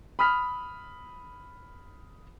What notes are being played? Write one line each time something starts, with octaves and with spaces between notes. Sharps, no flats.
B5 D#6 F6 B6